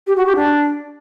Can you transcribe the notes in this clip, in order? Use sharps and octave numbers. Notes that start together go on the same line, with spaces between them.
G4
F#4
G4
D4